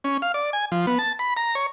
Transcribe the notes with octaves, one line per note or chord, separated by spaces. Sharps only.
C#4
F5
D5
G#5
F3
B3
A5
B5
A#5
C#5